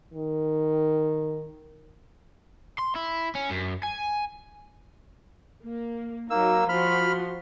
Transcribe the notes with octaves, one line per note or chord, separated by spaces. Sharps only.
D#3
C6
E4
C#4
F#2
G#5
A#3
F#3 A#3 D#4 E6
F3 F#4 B5 C6 F6